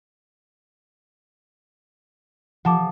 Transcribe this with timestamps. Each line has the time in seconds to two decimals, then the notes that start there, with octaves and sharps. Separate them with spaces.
2.65 F3 F#5 A5 D6